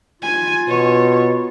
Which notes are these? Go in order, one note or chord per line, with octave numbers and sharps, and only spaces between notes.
F4 G#5
B2 C#5